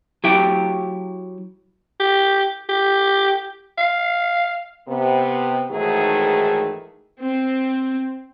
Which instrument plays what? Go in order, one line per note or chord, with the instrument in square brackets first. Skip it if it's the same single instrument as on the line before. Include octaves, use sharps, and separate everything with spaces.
[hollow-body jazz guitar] F#3 E4 G4
[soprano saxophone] G4
G4
F5
[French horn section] C3 B3
G#2 D#3 E3 F#3 A3 G#4
[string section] C4